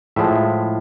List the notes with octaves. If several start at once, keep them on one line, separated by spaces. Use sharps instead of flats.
A2 F3 G#3 E5